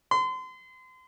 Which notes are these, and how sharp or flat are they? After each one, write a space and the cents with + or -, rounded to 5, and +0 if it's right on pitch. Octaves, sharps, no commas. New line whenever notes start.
C6 -35